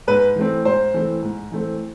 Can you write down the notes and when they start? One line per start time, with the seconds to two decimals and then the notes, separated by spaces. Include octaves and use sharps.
0.07 G#2 B4
0.36 E3 A3 C4
0.65 G#2 C5
0.94 E3 A3 C4
1.22 G#2
1.52 E3 A3 C4